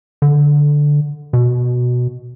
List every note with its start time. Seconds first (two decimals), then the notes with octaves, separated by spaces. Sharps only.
0.22 D3
1.33 B2